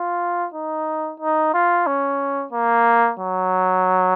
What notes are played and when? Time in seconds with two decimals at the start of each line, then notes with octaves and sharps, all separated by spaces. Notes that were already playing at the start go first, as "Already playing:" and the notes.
Already playing: F4
0.54 D#4
1.20 D#4
1.54 F4
1.87 C#4
2.53 A#3
3.19 F#3